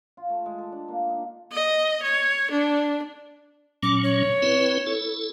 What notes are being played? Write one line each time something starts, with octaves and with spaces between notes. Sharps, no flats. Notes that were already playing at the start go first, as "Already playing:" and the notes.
F4
A3
G#3
A4
D4
A#3
D#4
D#5
C#5
D4
A#2 F#3 C#4 D6
C#5
C4 E4 B4
E4 A4